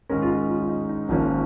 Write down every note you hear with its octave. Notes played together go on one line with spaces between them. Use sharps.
G#2 D#3 G#3 C#4 A#4
F4
D#4
F4
F4
D#4
D#4
G#1 G#2 F3 A#3 C#4